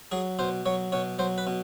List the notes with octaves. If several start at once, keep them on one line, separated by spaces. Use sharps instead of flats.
F#3 G#4
B2 C5
F#3 C#5
B2 C#5
F#3 C5
B4
B2